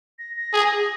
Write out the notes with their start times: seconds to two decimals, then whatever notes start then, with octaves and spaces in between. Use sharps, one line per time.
0.19 A#6
0.37 A#6
0.53 G#4